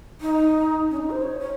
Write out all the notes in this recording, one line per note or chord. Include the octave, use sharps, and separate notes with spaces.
D#4
C#4
D#4
C5
C#5
C#5